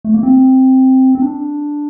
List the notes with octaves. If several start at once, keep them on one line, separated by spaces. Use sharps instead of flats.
A3
A#3
C4
C4
D4